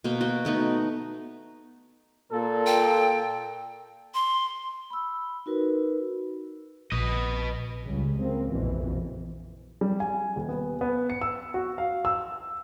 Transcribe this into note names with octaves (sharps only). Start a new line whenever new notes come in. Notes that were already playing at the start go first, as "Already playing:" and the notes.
B2 A#3 G5
F#4 G5
A3 B3 D#4
A#2 A4
G5
C6
B5 E6
D#4 F#4 A#4 B4
A#1 B4 D#5
C#2 C#3 G3
A#3 C4
A#1 F2 B2 E3
G3
G#5
D#1
B3
B3
C#7
E6
F#4
F5
E6